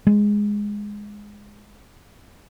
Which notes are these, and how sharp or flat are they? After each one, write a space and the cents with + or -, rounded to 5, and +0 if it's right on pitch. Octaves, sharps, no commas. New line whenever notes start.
G#3 -5